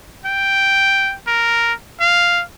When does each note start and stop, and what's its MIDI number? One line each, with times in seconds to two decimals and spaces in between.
0.26 1.15 79
1.27 1.73 70
2.00 2.43 77